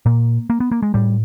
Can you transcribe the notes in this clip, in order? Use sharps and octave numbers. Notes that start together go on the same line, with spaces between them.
A#2 A#3
A#3
B3
A#3
G#3
A2 G3